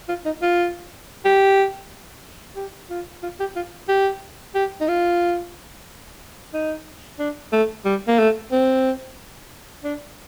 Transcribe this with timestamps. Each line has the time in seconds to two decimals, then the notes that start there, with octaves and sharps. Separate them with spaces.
0.09 F4
0.25 D#4
0.42 F4
1.25 G4
2.56 G4
2.90 F4
3.23 F4
3.40 G4
3.56 F4
3.88 G4
4.54 G4
4.80 D#4
4.88 F4
6.53 D#4
7.19 D4
7.52 A3
7.85 G3
8.07 A#3
8.19 A3
8.52 C4
9.84 D4